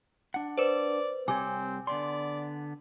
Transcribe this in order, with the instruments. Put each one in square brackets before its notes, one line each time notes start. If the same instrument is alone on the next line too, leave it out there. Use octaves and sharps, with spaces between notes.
[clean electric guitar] D4 F#5
[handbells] B4 C5 [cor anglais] D5
[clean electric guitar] C2 G4 C#5 [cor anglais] C4 [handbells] G#5 D6
[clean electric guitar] D3 B3 C6 [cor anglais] D5